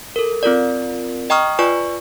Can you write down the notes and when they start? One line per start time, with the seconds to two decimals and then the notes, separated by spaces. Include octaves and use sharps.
0.16 A4 A#4
0.43 C4 F4 A#4 D5
1.30 D#5 G5 A#5 C#6 D#6 F6
1.59 F4 B4 D5 G#5 C#6